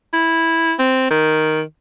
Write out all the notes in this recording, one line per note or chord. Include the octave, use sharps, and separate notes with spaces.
E4
C4
D#3